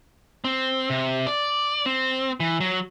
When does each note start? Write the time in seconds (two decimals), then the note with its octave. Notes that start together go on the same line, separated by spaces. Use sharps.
0.44 C4
0.90 C3
1.27 D5
1.86 C4
2.40 E3
2.60 F#3